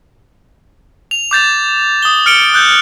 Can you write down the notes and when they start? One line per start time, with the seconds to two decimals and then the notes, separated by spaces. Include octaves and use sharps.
1.11 F7
1.31 D6 G6 A6 F7
2.02 D#6 G7
2.26 F6 C#7 D7 G7
2.54 F#6 G6